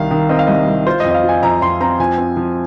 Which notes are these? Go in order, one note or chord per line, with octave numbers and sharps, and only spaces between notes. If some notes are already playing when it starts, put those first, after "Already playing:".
Already playing: C2 D#3 F5
D#3
C4 D#5
F5
C2 D#5
C2
F4 C5
D#5
F2
D#5
F5
F4
G#5
F2 A#5
F2 C6
C4 A#5
F3 G#5
C4
F3